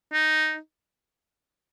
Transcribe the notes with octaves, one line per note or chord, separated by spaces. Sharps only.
D#4